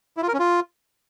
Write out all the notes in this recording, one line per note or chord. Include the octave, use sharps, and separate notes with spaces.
E4
F4
A#4
C#4
F4